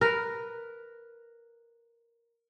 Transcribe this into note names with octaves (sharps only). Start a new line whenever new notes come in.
A#4 B4